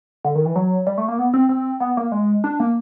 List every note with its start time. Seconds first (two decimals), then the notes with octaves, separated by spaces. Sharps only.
0.25 D3
0.35 D#3
0.45 E3
0.56 F#3
0.87 G3
0.98 A3
1.08 A#3
1.18 B3
1.34 C4
1.49 C4
1.80 B3
1.97 A#3
2.12 G#3
2.44 D4
2.60 A#3